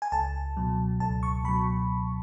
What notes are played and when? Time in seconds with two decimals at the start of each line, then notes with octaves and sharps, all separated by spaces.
0.02 G#5
0.12 C#2 A5
0.57 B2 F#3
1.00 C#2 A5
1.23 C#6
1.44 B2 B5
1.48 F#3